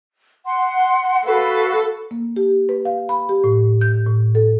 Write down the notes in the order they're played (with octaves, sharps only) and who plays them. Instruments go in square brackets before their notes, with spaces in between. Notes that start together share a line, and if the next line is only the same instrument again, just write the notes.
[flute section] F#5 C6
[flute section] F#4 B4 F5 [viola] A4
[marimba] A#3
G4
B4
F5
B5
G4
A2
G6
A2
A4